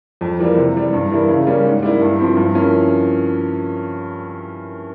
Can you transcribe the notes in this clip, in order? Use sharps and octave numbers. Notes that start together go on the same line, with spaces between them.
F2
E3 G3 A#3
C3
E3 G3
G2
E3 G3 A#3 E4
C#3
G3 A#3 C#4
G#2
G3 A#3 E4
G2
F3 C4 E4
G2
F3 A#3 C#4 E4